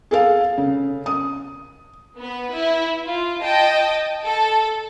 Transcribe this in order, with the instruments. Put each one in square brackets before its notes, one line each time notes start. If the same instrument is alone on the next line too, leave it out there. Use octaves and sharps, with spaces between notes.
[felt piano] G#4 A4 F5
C#3
D#6
[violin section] B3 B4
E4
F4
D#5 G5 A5
A4